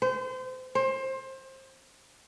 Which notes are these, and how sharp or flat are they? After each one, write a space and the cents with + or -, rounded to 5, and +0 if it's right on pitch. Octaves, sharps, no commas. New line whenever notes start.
C5 -30
C5 +25